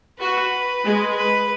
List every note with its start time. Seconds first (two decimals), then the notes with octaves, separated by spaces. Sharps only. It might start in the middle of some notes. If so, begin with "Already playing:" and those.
0.20 F#4 B4
0.84 G#3
1.16 B4